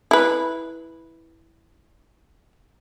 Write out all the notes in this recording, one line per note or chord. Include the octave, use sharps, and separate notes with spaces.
E4 B4